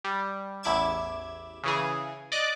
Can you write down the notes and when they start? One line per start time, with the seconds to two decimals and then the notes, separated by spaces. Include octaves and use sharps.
0.04 G3
0.63 A1 E2 E4 D6 G#6 E7
1.64 C#3 E3 G#4
2.32 D5 D#5 D6 F#6